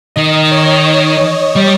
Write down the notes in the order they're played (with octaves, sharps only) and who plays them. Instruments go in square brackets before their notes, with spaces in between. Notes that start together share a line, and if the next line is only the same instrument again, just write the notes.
[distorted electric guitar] D#3 [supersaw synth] D#5
[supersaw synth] C#5
[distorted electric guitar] G3